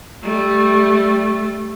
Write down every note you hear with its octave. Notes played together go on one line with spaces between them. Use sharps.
G3 A3